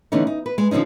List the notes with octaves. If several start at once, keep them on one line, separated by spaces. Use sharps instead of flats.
D3 E3 A3 B3 C#4 D#4
D#4
B4
G#3
D3 F3 C4 C#4 D#4